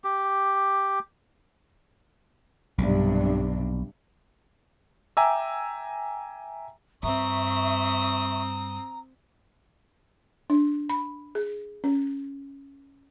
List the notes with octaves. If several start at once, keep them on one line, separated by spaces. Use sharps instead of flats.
G4
B1 G2 C3 D4
E5 G5 G#5 A#5 D6 E6
G2 C4 E5 A#5 C#6 D#6
D4
B5
G#4
C#4